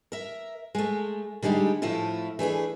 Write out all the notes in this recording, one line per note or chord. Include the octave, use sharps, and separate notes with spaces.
A#4 E5
G#3 A3
D3 G3 G#3 D#4 G4
A2 F3 A3 E4 F4
E3 A3 D4 G#4